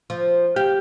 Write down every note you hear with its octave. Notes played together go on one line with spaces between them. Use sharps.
F3
G4 F5